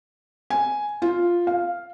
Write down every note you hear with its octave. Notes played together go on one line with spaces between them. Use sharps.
G#5
F4
F5